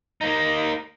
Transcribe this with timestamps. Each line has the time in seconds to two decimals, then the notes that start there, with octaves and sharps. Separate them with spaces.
0.21 A#3 D#4